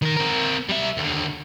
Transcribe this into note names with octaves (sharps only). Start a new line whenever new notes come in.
D#3 A#4
C4 A#4
G3 E5
D#2 D3